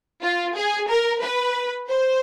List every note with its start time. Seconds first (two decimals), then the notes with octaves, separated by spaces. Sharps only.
0.22 F4
0.57 G#4
0.90 A#4
1.22 B4
1.89 C5